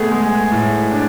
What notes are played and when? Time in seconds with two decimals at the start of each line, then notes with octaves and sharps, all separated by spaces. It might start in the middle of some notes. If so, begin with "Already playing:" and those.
Already playing: A3 B3 G#4
0.11 G#3
0.51 A2
0.91 D4